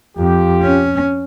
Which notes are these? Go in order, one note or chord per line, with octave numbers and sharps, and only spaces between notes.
F2 F4 G4
C#4